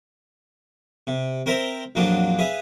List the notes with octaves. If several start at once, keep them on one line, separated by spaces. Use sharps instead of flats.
C3
C4 A#4 C5 E5 A#5 C6
A#1 F2 F#3 A#3 D4 F4
G#4 B4 E5 F5